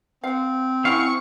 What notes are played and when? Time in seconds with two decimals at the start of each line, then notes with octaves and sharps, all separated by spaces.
0.24 C4 F5 F#5
0.85 C#4 E4 F5 F#5 C#6